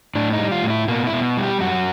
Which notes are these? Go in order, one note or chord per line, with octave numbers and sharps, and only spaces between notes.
A2 D4
D#4
G3
F4
A2
E4
B2 A#3
E4
B2
G3
G4
F#2 F#4